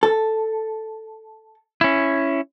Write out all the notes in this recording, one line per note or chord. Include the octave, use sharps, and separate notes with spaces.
A4
C#4 E4